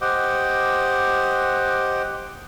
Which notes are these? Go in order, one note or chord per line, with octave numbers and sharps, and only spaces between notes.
G4 C5 D#5 F#5 D6